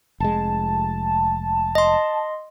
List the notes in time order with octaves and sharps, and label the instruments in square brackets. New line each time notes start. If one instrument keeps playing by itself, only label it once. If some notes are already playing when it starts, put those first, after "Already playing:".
[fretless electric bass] F1 G#3 [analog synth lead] A5
[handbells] D#5 C6